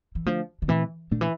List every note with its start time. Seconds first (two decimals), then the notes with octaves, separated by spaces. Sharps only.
0.15 E3
0.26 D3 F3 A3 D4
0.62 D3
0.68 A#2 E3 A3 C4
1.11 A#2 D3 A3 D4
1.21 E3